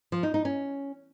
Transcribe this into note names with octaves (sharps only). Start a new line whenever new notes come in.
F3
D#4
D#4
C#4